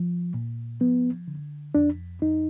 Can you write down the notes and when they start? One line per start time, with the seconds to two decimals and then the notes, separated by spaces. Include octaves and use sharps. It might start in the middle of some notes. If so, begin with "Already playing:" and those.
Already playing: F3
0.34 A#2
0.81 F3 B3
1.28 D3
1.75 F2 D4
2.22 F2 D#4